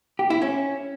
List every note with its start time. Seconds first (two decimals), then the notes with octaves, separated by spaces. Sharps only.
0.19 G4
0.30 E4
0.42 C#4